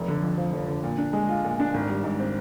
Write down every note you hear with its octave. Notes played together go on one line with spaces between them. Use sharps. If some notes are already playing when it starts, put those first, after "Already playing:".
Already playing: F1
D3
F2
F3
F1
D3
A#2
D4
G#3
F4
A#2
D4
G#1
G3
G#2
C4